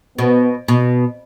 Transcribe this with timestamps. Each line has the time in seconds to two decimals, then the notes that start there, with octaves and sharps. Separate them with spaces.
0.18 B2 B3
0.68 B2